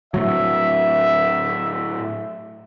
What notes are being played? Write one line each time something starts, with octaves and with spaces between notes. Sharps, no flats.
A2 F#3 E5